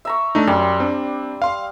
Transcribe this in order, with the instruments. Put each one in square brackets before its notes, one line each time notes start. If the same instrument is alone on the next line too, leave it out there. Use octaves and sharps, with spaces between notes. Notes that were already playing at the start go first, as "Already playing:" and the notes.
[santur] E5 A#5 C#6
[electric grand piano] A3 D4 D#4
[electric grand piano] F#2 [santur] G3 C6 D6
[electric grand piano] C4 D4
F5 C6